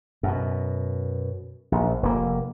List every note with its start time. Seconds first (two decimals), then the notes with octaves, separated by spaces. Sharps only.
0.23 F#2 B2
1.72 A#1
2.03 F1 A#3